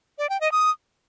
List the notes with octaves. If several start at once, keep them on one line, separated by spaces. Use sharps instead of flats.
D5
G5
D#5
D#6